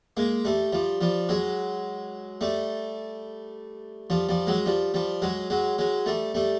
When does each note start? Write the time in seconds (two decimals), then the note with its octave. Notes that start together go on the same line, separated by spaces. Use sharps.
0.17 G#3 A#3
0.45 G3 A3
0.72 F3 G3
1.01 F3 G3
1.29 F#3 G#3
2.41 G3 A3
4.10 F3 G3
4.29 F3 G3
4.47 F#3 G#3
4.66 F3 G3
4.94 F3 G3
5.22 F#3 G#3
5.50 F#3 G#3
5.78 F#3 G#3
6.06 G3 A3
6.34 G3 A3